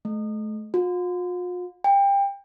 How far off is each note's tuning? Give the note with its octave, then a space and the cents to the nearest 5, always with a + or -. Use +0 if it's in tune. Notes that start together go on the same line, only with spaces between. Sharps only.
A3 -35
F4 +45
G5 +25